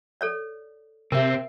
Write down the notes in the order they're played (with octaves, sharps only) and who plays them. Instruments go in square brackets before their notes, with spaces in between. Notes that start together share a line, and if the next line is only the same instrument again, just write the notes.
[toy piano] A4 C#5 D5
[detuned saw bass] C3 [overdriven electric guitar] C4 [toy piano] A#4 E5